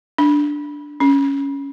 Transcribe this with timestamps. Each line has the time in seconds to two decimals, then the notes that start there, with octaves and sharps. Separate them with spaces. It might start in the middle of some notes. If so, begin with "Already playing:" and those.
0.18 D4
1.00 C#4